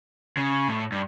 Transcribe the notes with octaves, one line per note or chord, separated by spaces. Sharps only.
C#3
A2
G2